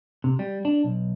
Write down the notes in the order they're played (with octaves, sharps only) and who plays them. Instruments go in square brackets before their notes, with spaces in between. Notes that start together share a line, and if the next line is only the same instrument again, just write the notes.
[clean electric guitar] C3
G3
D4
B1